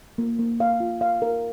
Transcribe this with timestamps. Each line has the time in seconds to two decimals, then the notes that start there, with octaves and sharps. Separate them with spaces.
0.18 A#3
0.39 A#3
0.60 F5
0.80 F4
1.01 F5
1.22 A#4